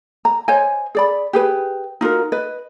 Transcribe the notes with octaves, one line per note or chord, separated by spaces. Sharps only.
A#5
C5 C#5 D#5 G#5
G#4 D5 B5
G4 G#4 B4
D#4 F4 F#4 A#4
B4 D#5